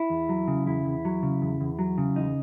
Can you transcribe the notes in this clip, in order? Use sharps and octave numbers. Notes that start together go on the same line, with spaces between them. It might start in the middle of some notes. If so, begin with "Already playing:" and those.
Already playing: E4
E2
F#3
C#3
E2 E4
E2
F#3
C#3
E2
E2
F#3
C#3
E2 D#4